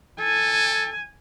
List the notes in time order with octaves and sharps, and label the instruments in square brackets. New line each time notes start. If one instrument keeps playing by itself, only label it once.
[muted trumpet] A4 [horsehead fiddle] G#5